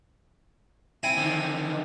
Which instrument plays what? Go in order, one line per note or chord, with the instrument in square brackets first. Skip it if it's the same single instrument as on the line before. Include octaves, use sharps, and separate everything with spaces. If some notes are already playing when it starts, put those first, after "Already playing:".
[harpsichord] C4 E4 G#5
[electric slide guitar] D3 D#3